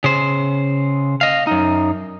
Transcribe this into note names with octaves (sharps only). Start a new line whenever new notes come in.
C#3 C5
D#5 F5
F#2 D#4